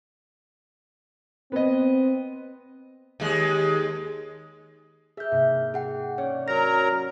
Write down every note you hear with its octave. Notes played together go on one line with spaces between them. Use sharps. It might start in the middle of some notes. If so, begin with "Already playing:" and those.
B3 C4 D#5
D#2 G#3
G#4 A#4 E5 G6
G#2 C3 A#3
G#4 F#5 G5
C#4 C#5 D5
F#3 A#4 A#5 A#6